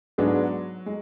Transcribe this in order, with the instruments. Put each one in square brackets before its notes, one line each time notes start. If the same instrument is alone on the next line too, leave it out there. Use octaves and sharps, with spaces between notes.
[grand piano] G#2 G#3 B3 D4 G#4 [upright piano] F#3
[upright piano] G#3